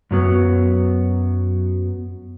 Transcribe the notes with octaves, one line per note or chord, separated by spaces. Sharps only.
F#2 F#3 B3